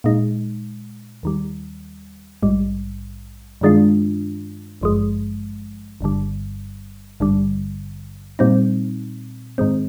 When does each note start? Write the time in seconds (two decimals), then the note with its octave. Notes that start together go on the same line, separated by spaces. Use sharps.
0.04 A#2 G#3 D#4
1.23 D#2 D#3 G3
2.43 A#1 G#2 G3
3.61 G2 D#3 G#3 D4 F4
4.81 G#1 G2 F3 G#3
6.01 G1 G2 D3 G3
7.20 G#1 G2 D3 G3
8.39 A#2 G3 C4 D#4
9.58 G#2 D#3 G#3 C4